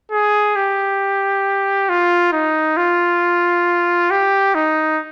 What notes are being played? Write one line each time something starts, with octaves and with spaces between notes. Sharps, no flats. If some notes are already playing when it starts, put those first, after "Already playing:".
G#4
G4
F4
D#4
F4
G4
D#4